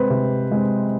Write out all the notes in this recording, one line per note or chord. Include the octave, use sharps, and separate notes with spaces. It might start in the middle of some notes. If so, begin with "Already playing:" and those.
Already playing: C3 G#3 C4 B4 C5
C3
G#3 C4